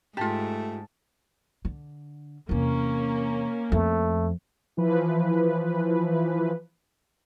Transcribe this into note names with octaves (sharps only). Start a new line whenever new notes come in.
G#2 A3 F4 G4 A5
D3
E2 C3 A#3 C#4
F2 A3
E3 F3 B4